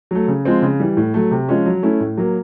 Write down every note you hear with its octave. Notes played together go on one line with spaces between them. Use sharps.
F#3 A3
C#3
F3 G#3 C4
C#3
E3 G3
A2
F#3 A3
C3
F3 G#3 C#4
F#3
A3 C#4 E4
A2
F#3 A#3